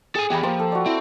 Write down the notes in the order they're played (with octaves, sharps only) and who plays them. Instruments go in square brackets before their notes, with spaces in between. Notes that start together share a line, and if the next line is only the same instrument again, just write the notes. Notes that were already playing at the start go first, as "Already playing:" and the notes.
[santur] G#4 [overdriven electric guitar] A4 G#5
[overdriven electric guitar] E3 B3 [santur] G4 B5
[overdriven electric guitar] F3 [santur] A#3 C5 C6
[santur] A4
F#4 D5
[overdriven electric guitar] C4 [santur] E4